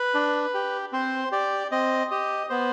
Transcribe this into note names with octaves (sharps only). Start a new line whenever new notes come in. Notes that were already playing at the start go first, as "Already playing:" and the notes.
Already playing: B4
D4
G4
C4 C5
G4 D5
C4 D#5
G4 D#5
B3 C5